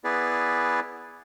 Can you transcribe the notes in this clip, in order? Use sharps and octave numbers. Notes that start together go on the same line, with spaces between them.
B3 E4 G#4 B4 D5